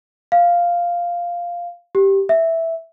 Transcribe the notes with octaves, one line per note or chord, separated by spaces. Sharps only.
F5
G4
E5